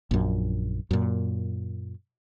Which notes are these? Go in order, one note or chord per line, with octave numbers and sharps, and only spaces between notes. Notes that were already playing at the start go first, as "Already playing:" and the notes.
A#1 F#2
F#2 A#2